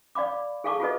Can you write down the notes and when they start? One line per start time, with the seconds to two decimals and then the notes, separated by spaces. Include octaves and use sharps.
0.15 D5 F5 B5 D6
0.64 G#4 A4 F5 A5 C#6 D6
0.80 F4 F#4 A4 B4 D#5